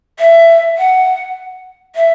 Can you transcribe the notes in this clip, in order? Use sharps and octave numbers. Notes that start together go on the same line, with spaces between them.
E5
F#5
E5